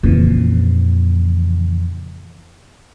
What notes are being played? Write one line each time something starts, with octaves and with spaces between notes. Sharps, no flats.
F2 A#2 C#3 E3